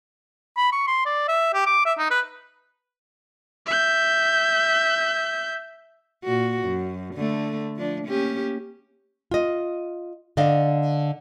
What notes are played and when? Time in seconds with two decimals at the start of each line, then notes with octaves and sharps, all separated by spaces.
0.57 B5
0.72 C#6
0.87 C6
1.05 D5
1.28 E5
1.54 G4
1.66 D6
1.85 E5
1.98 D#4
2.11 B4
3.66 E5 G6
6.24 A#2 F#4
6.64 F#2
7.15 D3 A3
7.76 F3 D4
8.06 A#3 C#4 G4
9.31 F4 D#5
10.37 D3 D5 D#5 F5